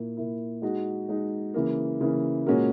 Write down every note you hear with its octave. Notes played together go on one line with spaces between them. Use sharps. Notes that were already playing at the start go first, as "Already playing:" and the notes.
Already playing: A#2 A#3 E4
A#2 A#3 E4
G#3 D#4 F#4
G#3 D#4 F#4
C#3 E3 A#3
C#3 E3 A#3
A#2 G#3 C#4 F#4 A#4